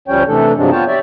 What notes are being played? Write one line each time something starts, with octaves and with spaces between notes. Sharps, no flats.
D2 F3 G3 C#4 C#5 G5
C3 E3 A3 D4 A4
G2 C3 F3 F#3 G#3 D4
B3 F4 C#5 G5 A5
G4 C#5 D5 E5